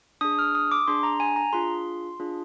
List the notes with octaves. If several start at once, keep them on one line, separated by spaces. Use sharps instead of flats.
D4 G#4 D#6
F6
D#6
D6
D4 G#4 C6
A#5
G#5
A#5
D4 F4 G#4 C6
D4 F4 G#4